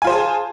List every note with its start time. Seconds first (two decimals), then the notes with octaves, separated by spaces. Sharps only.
0.02 G#5
0.04 F4
0.07 C5
0.10 G#4
0.12 A5